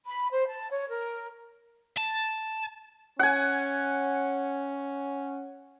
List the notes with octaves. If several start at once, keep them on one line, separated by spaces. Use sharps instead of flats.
B5
C5
A5
C#5
A#4
A5
C#4 F#5 G#5